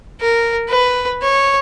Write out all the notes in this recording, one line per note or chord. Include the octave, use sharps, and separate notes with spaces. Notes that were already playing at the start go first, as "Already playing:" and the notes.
A#4
B4
C#5